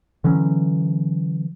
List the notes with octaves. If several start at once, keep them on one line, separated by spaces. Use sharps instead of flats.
D3 E3 F#3 C#4